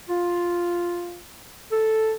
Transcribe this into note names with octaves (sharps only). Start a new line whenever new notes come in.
F4
A4